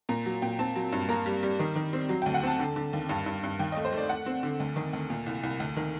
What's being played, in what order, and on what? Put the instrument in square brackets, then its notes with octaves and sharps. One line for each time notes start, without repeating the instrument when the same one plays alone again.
[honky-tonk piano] A#2 A#5
F#3
A#2 G5
C4 A5
F#3
G2
A#3 A#5
G3
G3
D#3
D#3
C4
F#3
D2 G5
F#5
C4 A5
D3
D3
D#2
G2
G2
G2
D#2 G5
A3 D#5
C5
A3 D5
A3 F#5
C4
D3
D2
D#3
D2
A#2
C2
C2
D2
D#3